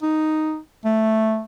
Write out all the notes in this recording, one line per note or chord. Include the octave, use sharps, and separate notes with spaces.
D#4
A3